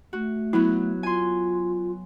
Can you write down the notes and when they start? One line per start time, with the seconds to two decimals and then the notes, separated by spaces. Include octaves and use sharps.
0.13 A3 F#4
0.53 F#3 B3 E4
1.03 F4 G#5 C6